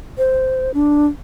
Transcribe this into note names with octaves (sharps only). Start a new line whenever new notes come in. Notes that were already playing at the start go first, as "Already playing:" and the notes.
C5
D4